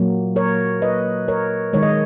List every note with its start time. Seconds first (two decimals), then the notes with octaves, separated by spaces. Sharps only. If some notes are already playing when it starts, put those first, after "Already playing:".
Already playing: A#2 F#3 A#3
0.36 A#4 C#5
0.82 B4 D#5
1.28 A#4 C#5
1.73 D#3 G#3 C#5
1.83 D#5